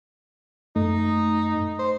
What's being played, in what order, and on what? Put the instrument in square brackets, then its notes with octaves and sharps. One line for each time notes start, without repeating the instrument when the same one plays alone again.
[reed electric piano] F#2 A3 [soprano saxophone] D#4
[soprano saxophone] C5